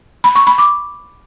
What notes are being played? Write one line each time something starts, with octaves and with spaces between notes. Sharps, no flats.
B5
C#6
B5
D6